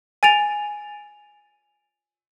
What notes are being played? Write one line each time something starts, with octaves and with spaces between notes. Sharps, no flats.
G#5 A6 D7 F7